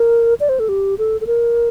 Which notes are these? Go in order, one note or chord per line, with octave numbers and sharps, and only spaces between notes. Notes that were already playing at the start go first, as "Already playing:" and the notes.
Already playing: A#4
D5
C5
A4
G4
A4
A4
A#4